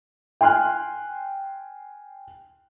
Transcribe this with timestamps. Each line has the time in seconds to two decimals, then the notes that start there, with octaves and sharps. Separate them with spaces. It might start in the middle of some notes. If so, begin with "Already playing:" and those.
0.41 G5 G#5 C6 F6 F#6